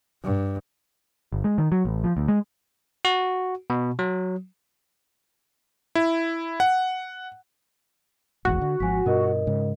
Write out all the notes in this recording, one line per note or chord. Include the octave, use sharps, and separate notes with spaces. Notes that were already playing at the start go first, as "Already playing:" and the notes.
G2
G1
G#3
D#3
F#3
A1
F3
D2
G#3
F#4
B2
F#3
E4
F#5
D1 G#1 E2 F#4
D3
G#1 F3 G#5 B6
G2 B2 F4 A#4 D#5
G#2 C#3